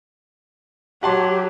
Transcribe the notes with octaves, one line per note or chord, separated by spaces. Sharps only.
F#3 G4 F#5 A5 C6